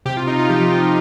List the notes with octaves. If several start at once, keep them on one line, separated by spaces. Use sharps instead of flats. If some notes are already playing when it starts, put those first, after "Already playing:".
C3 G4
F4
C3 D#4
F4
F3 G4